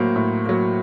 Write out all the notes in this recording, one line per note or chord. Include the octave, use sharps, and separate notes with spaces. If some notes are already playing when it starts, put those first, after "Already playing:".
Already playing: A2 F#3 A#3 C5
A2
F#3 A#3